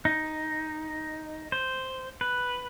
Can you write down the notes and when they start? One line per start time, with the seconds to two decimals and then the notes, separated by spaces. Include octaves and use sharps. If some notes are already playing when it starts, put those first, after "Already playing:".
0.05 D#4
1.52 C5
2.21 B4